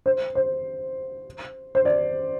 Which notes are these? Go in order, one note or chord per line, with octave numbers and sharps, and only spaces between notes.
C5
C5
C5
D5